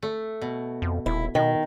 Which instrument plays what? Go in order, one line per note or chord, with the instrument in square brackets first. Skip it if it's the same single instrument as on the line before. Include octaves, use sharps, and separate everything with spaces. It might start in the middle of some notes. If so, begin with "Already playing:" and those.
[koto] A3
B2
[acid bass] F2
[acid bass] D#1 [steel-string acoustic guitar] E4
[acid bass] B2 [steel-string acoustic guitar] D#3